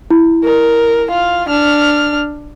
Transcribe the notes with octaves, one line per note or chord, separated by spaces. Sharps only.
E4
A#4
F4 F5
D4 F6